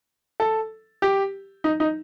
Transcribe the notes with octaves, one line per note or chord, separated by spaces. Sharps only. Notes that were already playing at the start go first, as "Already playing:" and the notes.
A4
G4
D#4
D#4